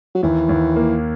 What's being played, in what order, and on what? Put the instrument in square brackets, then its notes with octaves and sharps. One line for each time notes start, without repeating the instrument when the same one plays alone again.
[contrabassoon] F#3
[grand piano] D#2 [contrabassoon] E3
[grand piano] D#2
A#3